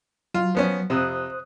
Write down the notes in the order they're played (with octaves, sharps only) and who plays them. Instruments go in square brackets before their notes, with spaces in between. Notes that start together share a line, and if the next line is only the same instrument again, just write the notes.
[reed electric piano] F#3 [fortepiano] F4
[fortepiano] F3 B3 C#4
[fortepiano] F2 C3 [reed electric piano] C5 D#6 F#6